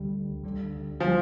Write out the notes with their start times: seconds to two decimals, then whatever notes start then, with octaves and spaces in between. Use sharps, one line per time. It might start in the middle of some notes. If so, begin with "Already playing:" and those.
Already playing: D2 D3 G3
0.44 D2 D3 G3
1.00 D3 F3 G3